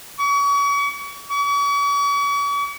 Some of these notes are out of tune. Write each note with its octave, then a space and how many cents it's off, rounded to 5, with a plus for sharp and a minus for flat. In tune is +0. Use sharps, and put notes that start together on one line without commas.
C#6 +40
C#6 +45